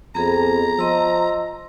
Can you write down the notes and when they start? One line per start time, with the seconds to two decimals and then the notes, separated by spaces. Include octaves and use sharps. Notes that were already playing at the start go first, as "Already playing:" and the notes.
0.15 F2 B3 G#4 A#5
0.79 F3 D#5 C6 E6